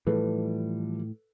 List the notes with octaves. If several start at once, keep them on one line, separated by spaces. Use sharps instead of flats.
A2 E3 F3 G3 A4 B4